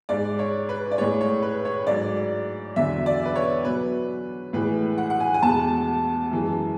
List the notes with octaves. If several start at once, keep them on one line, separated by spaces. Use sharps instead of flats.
G#2 G#3 D5
C#5
B4
D5
A2 G#3 C#5
C#5
B4
C#5
G#2 F#3 D5
E2 D3 F#3 E5
D5
B4
C#5
B2 F#3 B4
A2 E3 G#3 B4
F#5
F#5
G#5
G#5
E2 B2 G#3 A5
F#2 E3 G#3